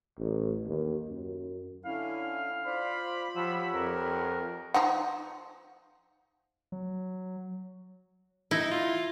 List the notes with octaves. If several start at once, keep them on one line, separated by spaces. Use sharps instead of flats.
A1
D#2
F#2
D3 C#4 E4 F5
F4 C5 D5 B5
F3 G4 C#5 F#5 E6
F2 A#4
F3 D#4 F#5
F#3
D#4 E4
F4